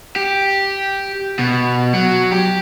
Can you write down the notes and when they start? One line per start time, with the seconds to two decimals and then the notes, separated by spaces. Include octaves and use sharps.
0.16 G4
1.39 B2
1.94 F#3
2.32 G4